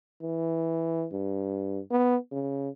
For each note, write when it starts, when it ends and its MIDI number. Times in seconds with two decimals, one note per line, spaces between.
0.22 1.06 52
1.12 1.80 43
1.91 2.16 59
2.32 2.69 49